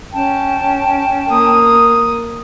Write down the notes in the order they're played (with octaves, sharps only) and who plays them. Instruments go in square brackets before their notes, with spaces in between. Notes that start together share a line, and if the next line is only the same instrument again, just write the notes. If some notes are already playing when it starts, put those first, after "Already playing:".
[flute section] C#4 G5 A5
[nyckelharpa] A#3 D#6